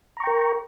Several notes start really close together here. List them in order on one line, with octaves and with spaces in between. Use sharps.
A#5 C#6 G5 A#4